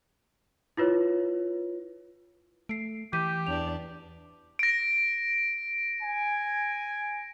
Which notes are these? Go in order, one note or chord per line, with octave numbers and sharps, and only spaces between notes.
E4 F4 B4 C#5
A3 C7 D7
E3 G4 G6 B6 D#7
E2 D4 D5 F7
A#6 D7
G#5